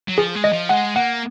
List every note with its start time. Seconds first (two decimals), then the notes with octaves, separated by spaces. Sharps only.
0.08 F#3
0.18 F3 G#4
0.35 G#3
0.44 D#5
0.53 F3
0.69 G#3 F#5
0.95 A#3 F#5